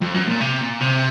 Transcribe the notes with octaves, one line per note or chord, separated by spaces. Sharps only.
F2
F#2
A#2
C3
A#2
C3